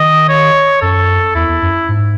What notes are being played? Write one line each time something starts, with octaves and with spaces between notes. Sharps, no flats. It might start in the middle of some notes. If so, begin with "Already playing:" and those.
Already playing: D#3 D#5
C#5
F#2 A4
E2 E4
E2
F#2
G#2